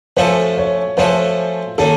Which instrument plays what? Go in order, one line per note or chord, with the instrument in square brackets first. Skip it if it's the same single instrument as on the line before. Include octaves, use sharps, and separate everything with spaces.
[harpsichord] F3 A3 C#4 F#4 A4 [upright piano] C5
[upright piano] C#5
[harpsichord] F3 A3 C#4 F#4 A4 [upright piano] C5
[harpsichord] D#3 A#3 C#4 [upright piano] A4